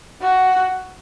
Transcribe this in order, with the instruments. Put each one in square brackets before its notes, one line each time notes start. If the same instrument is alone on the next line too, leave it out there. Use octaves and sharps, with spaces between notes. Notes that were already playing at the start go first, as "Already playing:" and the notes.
[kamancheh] F#4